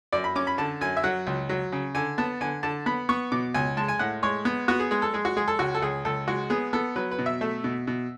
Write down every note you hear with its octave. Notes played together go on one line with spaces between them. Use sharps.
F#2 D5
B5
C#4 D6
B5
D3 A5
F#2 G#5
E5
F#3 F#5
C#2
F#3
C#3
D3 G#5
B3 A5
D3 G#5
D3 A5
B3 B5
B3 C#6
B2 D6
C#2 G#5
G#3 A5
G#5
A2 F#5
G#3 C#5
B3
B3 F#4
G#4
G#3 G#4
A4
G#3 G#4
F#4
G#3 G#4
A4
C#2 F#4
A4
C#2 G#4
C#2 A4
G#3 F#4
B3 G#4
B3 A4
F#3 B4
B4
B2
E5
A3
B2
B2